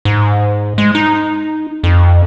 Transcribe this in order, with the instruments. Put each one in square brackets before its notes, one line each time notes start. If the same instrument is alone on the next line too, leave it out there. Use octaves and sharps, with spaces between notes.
[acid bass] G#2
G#3
D#4
F2